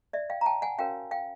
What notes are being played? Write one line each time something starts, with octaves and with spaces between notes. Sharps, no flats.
D5 E5
F5 G5
A#5
G5 A5
F#5 G#5
C#4 F#4 A#4 C#5 F5 G5
F5 G5